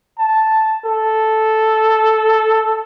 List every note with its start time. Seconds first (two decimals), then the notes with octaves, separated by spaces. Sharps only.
0.18 A5
0.85 A4